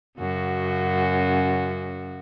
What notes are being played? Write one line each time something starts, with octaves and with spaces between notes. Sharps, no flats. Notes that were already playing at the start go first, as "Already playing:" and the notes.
F#2 C#3 F#4